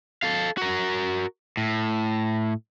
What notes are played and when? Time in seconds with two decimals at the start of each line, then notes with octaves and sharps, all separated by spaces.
0.23 A4 F5
0.57 F#4 A#4
1.57 A2